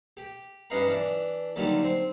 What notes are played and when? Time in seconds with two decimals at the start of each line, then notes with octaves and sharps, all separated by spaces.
0.17 G4
0.70 G2 C#4 B4 D#5 F5 A#5
0.87 E3 D4
1.56 D#2 D3 D#3 F#3 G3
1.83 C4